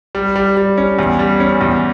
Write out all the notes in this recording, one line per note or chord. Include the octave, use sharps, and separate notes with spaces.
G3
G3
G3
C#4
E2
G3
C#4
E2